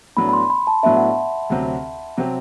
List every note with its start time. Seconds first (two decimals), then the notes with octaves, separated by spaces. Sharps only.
0.17 A2 F#3 B3 D4 B5
0.29 B5
0.33 C6
0.50 B5
0.67 A5
0.83 A2 F#3 B3 D4 E5
0.97 F#5
1.10 E5
1.50 D2 C3 F#3 C4 G4
2.17 C3 F#3 C4 G4